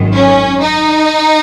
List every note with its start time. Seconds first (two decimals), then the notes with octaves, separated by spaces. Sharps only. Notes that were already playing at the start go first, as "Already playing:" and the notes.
Already playing: G#1 F#2 D#3
0.15 C#4
0.62 D#4